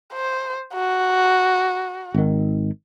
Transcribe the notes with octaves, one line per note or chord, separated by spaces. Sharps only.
C5
F#4
G#1 D#3